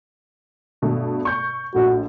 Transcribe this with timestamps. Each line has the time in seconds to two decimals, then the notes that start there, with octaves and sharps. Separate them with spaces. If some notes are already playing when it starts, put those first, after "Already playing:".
0.82 G2 B2 A3
1.25 C#6 G6
1.74 A#1 A2 F#4